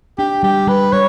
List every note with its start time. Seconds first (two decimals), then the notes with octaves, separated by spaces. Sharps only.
0.18 D4 G4
0.43 G3 G4
0.67 G3 B4
0.92 G3 C#5